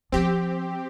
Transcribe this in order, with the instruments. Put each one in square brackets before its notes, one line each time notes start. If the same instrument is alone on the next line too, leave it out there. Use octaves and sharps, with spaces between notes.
[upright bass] F3 B3 [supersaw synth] C4 G4